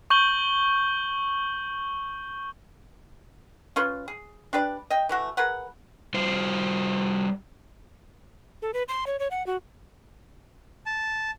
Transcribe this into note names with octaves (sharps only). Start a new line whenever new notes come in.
C#6 G6 F#7 G7
C#4 F4 B4
G#4
D4 G4 B4 D5
D#5 G5
E3 A3 F#4
G#4 A#4 B4 F#5
G3 F4 C5
A4
B4
C6
C#5
C#5
F#5
F#4
A5